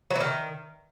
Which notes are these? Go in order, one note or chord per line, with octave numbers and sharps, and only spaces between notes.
F#3
E3
D#3